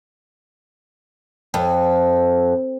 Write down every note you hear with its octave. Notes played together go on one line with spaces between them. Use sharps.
F2